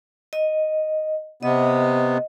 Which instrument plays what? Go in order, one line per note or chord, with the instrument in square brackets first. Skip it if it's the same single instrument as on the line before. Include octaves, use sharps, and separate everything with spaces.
[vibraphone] D#5
[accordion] C3 B3 [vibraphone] D#5